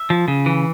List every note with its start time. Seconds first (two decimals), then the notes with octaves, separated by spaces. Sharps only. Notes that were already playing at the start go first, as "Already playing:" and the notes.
Already playing: E5
0.10 F3
0.28 C#3
0.46 E3